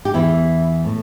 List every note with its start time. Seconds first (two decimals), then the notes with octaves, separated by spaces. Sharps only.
0.05 G4
0.14 E2 E3 E4
0.85 A2